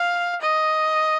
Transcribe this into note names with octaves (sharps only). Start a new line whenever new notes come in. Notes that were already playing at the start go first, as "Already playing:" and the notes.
Already playing: F5
D#5